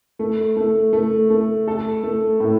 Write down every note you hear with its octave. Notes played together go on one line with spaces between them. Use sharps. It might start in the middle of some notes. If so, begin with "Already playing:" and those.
A3
A3
A3
A3
A4
A3
A2